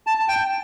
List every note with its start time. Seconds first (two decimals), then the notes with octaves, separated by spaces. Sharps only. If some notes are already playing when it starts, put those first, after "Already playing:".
0.07 A5
0.28 G5